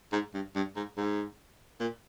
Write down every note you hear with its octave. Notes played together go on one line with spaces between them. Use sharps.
G#2
G2
G2
G#2
G#2
A#2